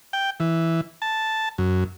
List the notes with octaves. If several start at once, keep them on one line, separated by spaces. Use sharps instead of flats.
G5
E3
A5
F#2